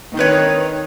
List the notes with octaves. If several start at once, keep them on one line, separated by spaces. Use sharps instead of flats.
D#3 C4 B4 C#5